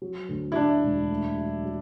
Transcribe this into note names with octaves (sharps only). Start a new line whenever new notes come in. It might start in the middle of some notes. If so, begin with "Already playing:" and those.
F#3
D2
E4
D2 D4
E1
A3
F#3
F#3